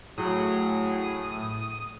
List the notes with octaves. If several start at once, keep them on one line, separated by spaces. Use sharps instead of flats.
A2 F#3 G#4 D#6